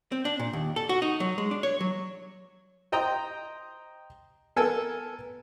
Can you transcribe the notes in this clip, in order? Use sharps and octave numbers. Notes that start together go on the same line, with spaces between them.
C4
D4
A#2
D#2
A4
F#4
D#4
F#3
G#3
D4
C#5
F#3
C5 D#5 G5 A#5
B3 A4 A#4 G#5 A5 E6